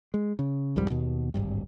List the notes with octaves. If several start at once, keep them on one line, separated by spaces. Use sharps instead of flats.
G#3
C#3
C2 F2 G#2 G3
D#2 B2
D1 G#1 G2